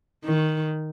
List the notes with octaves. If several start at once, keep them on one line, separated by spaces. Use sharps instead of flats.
D#3